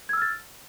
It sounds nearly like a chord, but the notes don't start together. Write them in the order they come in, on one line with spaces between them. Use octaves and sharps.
G#6 E6 F6 A6